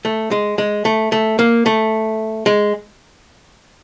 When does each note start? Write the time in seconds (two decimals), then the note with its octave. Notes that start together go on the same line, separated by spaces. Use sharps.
0.05 A3
0.31 G#3
0.58 G#3
0.85 A3
1.12 A3
1.39 A#3
1.66 A3
2.46 G#3